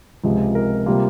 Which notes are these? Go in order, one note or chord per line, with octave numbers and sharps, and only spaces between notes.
C#2 C3 F3 G#3
A#4
C3 G3 A#3 F4